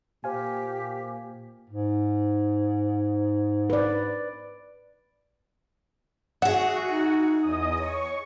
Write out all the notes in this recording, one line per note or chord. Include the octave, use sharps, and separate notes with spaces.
A#2 G4 C5 F5 G#5
G#2
B4 D5
F#4 G#4 E5 F#5
D#4
E2 D#5 D#6
C#5 C#6